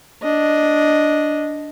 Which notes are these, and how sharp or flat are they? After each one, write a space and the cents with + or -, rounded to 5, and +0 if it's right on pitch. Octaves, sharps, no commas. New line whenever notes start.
D4 +0 D#5 +0